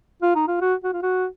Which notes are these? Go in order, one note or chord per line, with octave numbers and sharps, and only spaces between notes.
F4
D#4
F4
F#4
F#4
F4
F#4